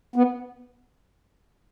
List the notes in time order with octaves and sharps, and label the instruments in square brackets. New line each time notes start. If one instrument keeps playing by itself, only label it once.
[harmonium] B3